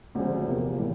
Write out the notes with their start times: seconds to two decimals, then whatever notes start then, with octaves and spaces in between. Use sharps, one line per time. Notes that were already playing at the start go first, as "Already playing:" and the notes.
0.15 D2 C#3 F3 G#3 C4
0.47 E2 C3 F3 A#3
0.79 A2 E3